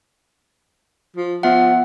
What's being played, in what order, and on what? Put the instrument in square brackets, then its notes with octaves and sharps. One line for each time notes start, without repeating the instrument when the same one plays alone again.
[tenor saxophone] F3
[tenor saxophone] F3 [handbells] B3 E5 F#5